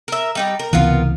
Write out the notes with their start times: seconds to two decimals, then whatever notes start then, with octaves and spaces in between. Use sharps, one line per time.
0.08 A#4 E5
0.35 G3 D#4 G4
0.59 A#4
0.73 C#2 C3 E3 B3 F4 A#4